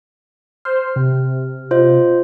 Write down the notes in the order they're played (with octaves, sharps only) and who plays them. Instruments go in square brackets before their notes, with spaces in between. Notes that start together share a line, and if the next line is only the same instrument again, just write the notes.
[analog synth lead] C5 [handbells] F6
[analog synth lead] C3
[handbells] F4 C5 D#5